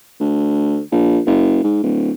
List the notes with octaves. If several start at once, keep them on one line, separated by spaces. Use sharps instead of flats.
D2
A#1
F#1
G#2
D1